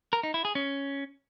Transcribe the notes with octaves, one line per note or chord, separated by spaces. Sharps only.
A#4
D#4
E4
G#4
C#4